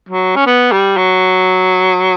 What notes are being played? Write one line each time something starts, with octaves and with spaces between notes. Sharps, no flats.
F#3
C#4
B3
G3
F#3